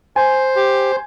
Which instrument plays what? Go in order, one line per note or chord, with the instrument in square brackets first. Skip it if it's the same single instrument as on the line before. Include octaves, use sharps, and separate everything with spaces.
[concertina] C5 [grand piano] G#5
[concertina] G4